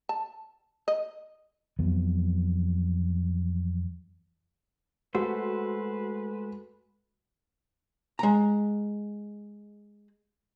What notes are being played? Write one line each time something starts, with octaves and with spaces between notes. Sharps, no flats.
A5
D#5
F2 E3 F#3 B3
G#3 A3 F#4 B4 C5
G#3 A#5